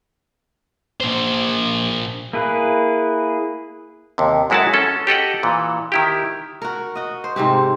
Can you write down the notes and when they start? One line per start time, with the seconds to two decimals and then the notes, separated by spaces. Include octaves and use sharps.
1.00 A#2 C5
2.33 A#3 E4 G#4 B4
4.18 D#2 C3
4.50 F#2 G#3 E4 F#4 A4 A5
4.74 C#4 A4
5.07 G4 A4 D#5 F#5
5.43 A#2 E3
5.92 D#3 E4 G4
6.62 F#4 A#4
6.95 F#4 D#5
7.24 C5
7.36 G#2 C3 C4 G4